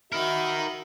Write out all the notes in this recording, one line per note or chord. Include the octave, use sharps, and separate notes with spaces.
D#4 F#4 A#4 E5 B5